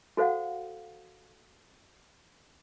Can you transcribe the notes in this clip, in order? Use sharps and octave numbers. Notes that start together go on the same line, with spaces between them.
F#4 A4 C5 F5 F#5